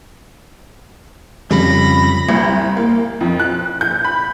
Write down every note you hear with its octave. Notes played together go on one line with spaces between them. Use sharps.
F2 C#3 G3 B5 A#6
C2
A#3
F2
F#6
G6
B5